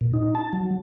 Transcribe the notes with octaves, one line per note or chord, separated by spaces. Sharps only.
A#2
D#4
A5
F#3